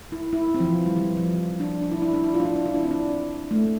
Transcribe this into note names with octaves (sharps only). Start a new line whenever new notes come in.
E4
E4
C4
F3
E3
E3
G3
E3
F3
D4
D4
E4
E4
D4
E4
F4
D4
E4
D4
E4
D4
C4
D4
A3